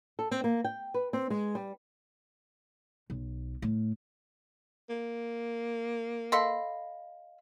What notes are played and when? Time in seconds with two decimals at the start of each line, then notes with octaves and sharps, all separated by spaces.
0.19 A4
0.31 C4
0.44 A#3
0.64 G5
0.94 B4
1.13 C4
1.30 G#3
1.55 G3
3.10 B1
3.62 A2
4.90 A#3
6.32 A4 D#5 F5 B5 C6